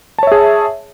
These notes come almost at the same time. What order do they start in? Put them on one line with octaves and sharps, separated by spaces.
A5 C#5 E5 G#4